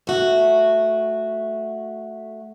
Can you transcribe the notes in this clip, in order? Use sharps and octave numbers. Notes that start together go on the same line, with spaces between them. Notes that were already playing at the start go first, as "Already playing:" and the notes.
A3 F#4